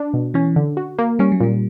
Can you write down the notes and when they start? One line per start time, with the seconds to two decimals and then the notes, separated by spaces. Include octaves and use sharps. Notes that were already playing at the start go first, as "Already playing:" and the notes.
Already playing: D4
0.14 B2
0.34 E3 C#4
0.56 D3
0.77 F#4
0.99 A#3
1.19 G3 C#4
1.32 F#3
1.41 A#2 G3